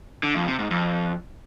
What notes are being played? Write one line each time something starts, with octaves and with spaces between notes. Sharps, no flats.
D3
F2
C3
G#2
F2